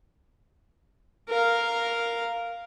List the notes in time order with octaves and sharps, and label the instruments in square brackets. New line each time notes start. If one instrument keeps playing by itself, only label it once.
[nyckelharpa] A#4 F5